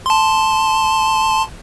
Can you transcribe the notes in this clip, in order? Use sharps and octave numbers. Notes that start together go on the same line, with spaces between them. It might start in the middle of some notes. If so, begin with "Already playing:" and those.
A5 C6